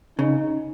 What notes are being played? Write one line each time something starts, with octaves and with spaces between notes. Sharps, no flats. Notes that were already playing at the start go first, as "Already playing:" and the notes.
C#3 D#4